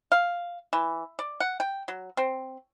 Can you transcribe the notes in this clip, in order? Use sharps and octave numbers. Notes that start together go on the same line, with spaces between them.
F5
E3
D5
F#5
G5
F#3
C4